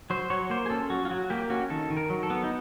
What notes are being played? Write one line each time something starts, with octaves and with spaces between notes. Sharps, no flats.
F#3 C5
F#3 C#5
A#3 C5
G#4
C#4 A4
F#3 F#4
F4
F#3 F#4
A#3 G4
C#4 F#4
D#3 A4
D#3
A#4
F#3
A4
B3
D#4